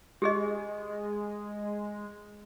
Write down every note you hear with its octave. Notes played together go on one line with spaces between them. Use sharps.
G#3 G4 G#4 D#5